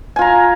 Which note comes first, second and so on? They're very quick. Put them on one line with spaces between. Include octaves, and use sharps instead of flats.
G#5 F4 A#5